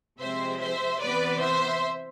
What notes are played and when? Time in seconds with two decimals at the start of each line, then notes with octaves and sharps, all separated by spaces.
0.20 C3 F3 G#3 C4 C5 E5
0.60 C5 E5
1.00 C3 E3 B3 B4 D5
1.41 C5 E5